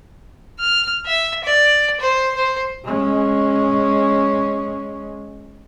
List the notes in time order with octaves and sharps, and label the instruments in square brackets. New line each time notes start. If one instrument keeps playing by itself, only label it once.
[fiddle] F6
E5
D5
C5
C5
[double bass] G#3 C#4